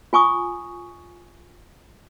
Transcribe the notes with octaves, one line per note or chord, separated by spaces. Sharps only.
F4 G#5 C#6 D#6